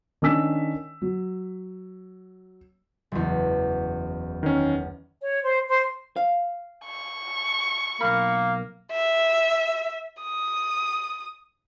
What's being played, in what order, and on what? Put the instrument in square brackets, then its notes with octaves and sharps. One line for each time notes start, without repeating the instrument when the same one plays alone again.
[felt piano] D#3 C#4 D4 G#5 E6 B6
F#3
[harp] F#1 E2
[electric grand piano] D#3 C#4
[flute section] C#5
C5
C5
[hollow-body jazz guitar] F5
[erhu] C#6
[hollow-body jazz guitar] B1 B5 [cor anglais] A#3
[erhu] E5
D#6